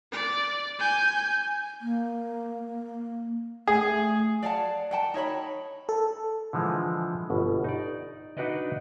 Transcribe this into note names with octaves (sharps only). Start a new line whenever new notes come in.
D5
G#5 G6
A#3
A3 G#4
D5 F5 F#5 A5
F#5 G5 A5
D#4 C#5 E5 B5
A4
D3 E3 F3 G#3
G1 B2
D#4 D5
D4 D#4 F#4 B4 D5 D#5